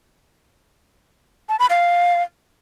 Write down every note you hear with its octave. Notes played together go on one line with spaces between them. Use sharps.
A5
B5
F5